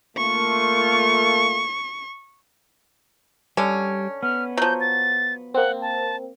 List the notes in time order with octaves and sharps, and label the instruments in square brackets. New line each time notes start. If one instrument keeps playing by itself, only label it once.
[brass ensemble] A3 A#3 F4 [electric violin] C#6
[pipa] D3 C#4 [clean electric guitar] G3
[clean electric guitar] B3 [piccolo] F6
[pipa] F3 F#3 [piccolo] G6
[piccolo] A6
[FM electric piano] A#3 C4 [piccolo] F#5
[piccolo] A5